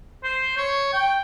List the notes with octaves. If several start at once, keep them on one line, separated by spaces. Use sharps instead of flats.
C5
C#5
G5